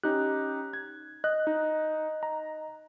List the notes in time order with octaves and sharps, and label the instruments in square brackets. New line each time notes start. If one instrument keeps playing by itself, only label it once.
[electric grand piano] C#4 D#4 G4 [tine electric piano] F#6
[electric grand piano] G#6
[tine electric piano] D#5 [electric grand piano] F#6
[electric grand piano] D#4
A#5